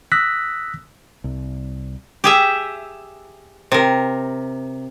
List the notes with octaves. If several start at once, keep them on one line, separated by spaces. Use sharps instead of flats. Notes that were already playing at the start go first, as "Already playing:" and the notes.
D#6 E6 F#6 A#6 B6
C2
G4 G#4 E5
C3 A#4